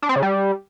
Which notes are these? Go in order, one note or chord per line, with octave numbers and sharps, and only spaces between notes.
D4
C4
C#3
G3